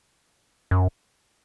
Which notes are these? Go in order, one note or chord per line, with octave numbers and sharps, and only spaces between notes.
F#2